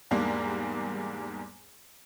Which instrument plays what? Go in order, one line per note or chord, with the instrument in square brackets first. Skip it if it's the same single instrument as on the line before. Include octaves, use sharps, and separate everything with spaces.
[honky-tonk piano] E2 G#2 G3 A#3 D4